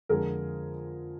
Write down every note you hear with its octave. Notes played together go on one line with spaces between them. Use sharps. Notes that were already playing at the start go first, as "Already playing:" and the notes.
F2 D3 F3 G#3 G#4 A#4